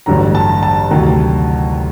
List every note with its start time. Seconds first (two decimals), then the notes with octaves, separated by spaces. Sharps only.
0.06 A1 G2 D3 F#3 A#5
0.35 A5
0.63 A5
0.91 D2 C3 D#3 F#3